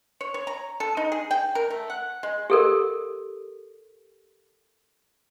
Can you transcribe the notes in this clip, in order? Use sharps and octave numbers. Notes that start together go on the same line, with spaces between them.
C#5
C#5
A#5
A4
D#4
G#4
G5
A#4
A3
F#5
G#3
G4 A4 A#4